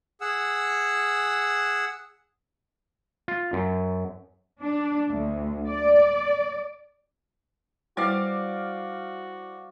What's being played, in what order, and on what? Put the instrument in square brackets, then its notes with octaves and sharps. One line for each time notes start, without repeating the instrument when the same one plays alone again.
[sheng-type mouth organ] G#4 F#5 E6
[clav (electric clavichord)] F4
F#2
[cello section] D4
D2
D5
[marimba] G3 B4 [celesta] E4 C5 F6 [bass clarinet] F#4 [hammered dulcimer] D5 F5